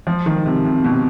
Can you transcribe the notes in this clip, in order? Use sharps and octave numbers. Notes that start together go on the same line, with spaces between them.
F3
D#3
C3
C3
B2